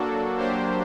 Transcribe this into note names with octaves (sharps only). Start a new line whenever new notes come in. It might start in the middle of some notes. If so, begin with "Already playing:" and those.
Already playing: F#3 A#3 D4 F#4 A4
F#3 A#3 D4 G4 C5